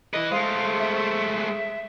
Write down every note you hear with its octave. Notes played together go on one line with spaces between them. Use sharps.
E4 B4 D#5
G#3 A3 C5 F5
E5